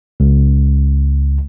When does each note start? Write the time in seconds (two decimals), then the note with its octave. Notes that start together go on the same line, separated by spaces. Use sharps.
0.20 C#2